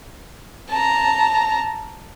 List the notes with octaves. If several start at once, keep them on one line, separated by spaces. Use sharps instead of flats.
A5 A#5